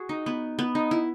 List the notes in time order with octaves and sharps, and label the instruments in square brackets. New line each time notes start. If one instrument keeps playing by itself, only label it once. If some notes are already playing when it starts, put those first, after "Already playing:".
Already playing: [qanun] F#4 G#4
D#4
B3
B3
D#4
E4